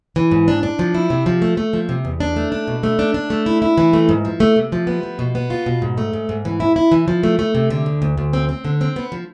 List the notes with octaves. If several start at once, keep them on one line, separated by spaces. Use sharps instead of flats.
E3
G#2
D4
D4
F3
E4
C3
F3
A3
A3
F3
C3
E2
D4
A3
D4
B2
A3
D4
D4
A3
E4
E4
E3
A3
G#2
F3
A3
C3
F3
B3
F3
B2
B3
F4
B2
G#2
A3
G#2
G#2
E3
E4
E4
E3
F3
A3
A3
C3
D3
D2
D2
D2
C4
C4
D3
C4
B3
F3